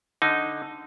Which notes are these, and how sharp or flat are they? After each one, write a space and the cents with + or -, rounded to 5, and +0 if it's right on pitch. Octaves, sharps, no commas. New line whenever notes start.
D3 +0 D#4 +0